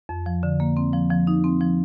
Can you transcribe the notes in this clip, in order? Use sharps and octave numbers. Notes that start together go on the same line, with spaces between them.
F2
F3
D3
A#3
C4
F3
F3
D#4
C4
F3